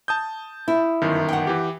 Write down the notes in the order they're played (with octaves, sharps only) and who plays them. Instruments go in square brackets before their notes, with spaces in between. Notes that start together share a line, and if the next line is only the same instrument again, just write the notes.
[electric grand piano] A5 D#6 G6
[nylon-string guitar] E4
[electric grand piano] G1 F#2 D#3
[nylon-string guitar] F#5 G5
[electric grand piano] E3 G4